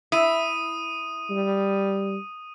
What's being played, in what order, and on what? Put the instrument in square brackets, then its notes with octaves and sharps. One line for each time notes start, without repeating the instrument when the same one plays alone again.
[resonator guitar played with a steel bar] E4 [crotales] D#6 D#7
[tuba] G3